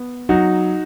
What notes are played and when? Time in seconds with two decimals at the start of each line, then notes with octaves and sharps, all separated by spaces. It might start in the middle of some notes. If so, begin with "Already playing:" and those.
Already playing: B3
0.29 F#3 D#4 F#4